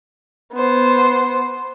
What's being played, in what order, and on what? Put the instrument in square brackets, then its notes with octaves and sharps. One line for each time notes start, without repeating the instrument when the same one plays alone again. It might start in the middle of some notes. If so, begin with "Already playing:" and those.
[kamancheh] B3 C5